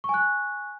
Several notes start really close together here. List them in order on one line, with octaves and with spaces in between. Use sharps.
C#6 G#5 F#6